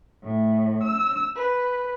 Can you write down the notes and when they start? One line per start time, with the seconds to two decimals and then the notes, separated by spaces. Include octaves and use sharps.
0.24 A2
0.83 E6
1.35 B4